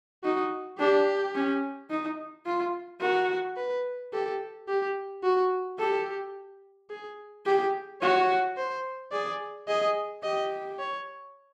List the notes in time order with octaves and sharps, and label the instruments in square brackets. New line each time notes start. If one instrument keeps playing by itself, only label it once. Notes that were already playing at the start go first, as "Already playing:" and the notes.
[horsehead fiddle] D#4 [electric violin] F#4
[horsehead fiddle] D4 [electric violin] G4
[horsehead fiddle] C#4
D#4
F4
[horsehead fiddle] F#4 [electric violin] A#4
[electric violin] B4
[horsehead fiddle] G4 [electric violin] A4
[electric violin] G4
F#4
[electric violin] G4 [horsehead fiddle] A4
[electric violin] G#4
[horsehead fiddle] G4 [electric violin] G#4
[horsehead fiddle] F#4 [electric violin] C#5
[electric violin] C5
[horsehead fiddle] G#4 [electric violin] D5
[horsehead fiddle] G#4 [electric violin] D#5
[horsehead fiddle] G4 [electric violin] D#5
[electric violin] C#5